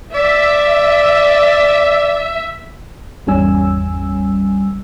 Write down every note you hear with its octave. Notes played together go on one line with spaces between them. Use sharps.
D5 E5
G#1 E2 G3 C#4 G#5 E6